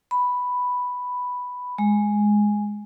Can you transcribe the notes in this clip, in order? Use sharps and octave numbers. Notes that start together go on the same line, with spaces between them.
B5
G#3